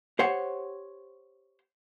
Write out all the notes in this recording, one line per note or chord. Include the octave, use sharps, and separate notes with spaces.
G4 C5 C#5 F#5